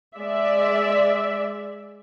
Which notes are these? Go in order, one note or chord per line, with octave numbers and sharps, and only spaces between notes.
G#3 D5 E5